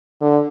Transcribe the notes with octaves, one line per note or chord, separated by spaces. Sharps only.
D3